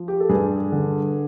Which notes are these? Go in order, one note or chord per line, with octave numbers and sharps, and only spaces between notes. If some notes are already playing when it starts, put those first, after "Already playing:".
Already playing: F3
G4
A4
G2 G#4
D3